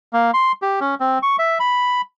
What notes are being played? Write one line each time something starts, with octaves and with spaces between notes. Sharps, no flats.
A#3
C6
G4
C#4
C4
C#6
E5
B5